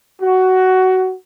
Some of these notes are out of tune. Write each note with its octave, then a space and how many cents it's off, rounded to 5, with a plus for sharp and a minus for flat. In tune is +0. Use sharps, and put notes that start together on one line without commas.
F#4 +15